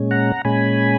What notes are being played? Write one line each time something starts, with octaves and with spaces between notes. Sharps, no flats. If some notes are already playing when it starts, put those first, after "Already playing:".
Already playing: A#2 G#3 C#4
F#5 A#5
A#2 G#3 C#4 G#5 B5